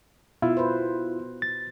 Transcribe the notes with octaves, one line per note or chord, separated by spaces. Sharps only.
B2 E4 F4
B4 C5
A6